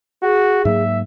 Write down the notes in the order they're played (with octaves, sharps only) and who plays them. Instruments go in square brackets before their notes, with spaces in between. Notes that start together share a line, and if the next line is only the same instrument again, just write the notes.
[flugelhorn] F#4 [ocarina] G#4
[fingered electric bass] G#2 F#3 A#3 [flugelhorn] E5